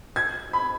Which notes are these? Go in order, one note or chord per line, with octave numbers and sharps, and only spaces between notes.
G#6
B5